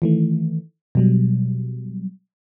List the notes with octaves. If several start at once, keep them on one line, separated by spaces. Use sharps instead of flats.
D#3 E3 A3
B2 F#3 G3